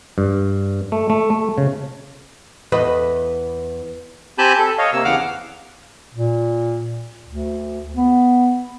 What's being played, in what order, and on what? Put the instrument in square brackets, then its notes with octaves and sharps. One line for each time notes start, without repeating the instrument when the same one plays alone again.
[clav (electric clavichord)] G2
A3
A3
A3
C#3
[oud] E2 B4 D#5
[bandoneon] C4 G4 G#5 A5 B5 G6
A4
C#5 D#5 F5
C3 A#3 E6
E2 C#3 F5 F#5 D6 F6
[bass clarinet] A#2
D2
B3